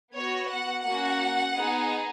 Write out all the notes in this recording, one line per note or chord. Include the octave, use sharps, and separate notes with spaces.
B3 F#4 C#5
F#5
A#3 C#4 F#4 F#5
B3 D#4 G#4